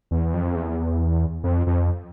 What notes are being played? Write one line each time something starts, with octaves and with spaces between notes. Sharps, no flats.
E2
F2
E2
F2
F2